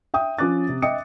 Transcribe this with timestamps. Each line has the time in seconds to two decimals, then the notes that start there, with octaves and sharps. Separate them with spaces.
0.14 E5 G5 D#6
0.38 F3 C#4 D6 F#6 A6
0.68 C3 C4
0.82 D#5 E5 G5 D#6 C#7